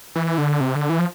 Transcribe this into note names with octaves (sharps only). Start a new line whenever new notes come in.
E3
D3
C3
D3
E3
F3